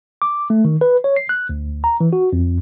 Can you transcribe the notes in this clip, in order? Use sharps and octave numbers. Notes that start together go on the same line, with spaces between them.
D6
A3
D#3
B4
C#5
C7
F#6
D2
A#5
E3
F#4
F2